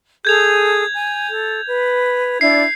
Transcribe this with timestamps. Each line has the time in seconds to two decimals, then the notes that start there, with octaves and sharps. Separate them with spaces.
0.25 G#4 A4 G6 G#6 F7
0.94 G#5
1.29 A4
1.67 B4
2.41 D4 E4 D5 C7